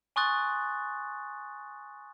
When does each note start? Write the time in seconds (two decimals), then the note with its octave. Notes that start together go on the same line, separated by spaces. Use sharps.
0.16 G#5 C6 C#6 D#6 F#6 A6